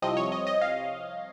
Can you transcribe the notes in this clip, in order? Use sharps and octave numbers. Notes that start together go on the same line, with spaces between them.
C2 C3 F3 C4 D#5
C#5
D#5
D#5
F5